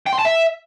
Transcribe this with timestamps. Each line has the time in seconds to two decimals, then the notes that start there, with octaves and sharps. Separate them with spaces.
0.06 G5
0.13 C6
0.19 A5
0.25 E5